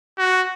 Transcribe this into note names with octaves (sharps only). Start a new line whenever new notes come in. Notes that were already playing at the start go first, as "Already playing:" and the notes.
F#4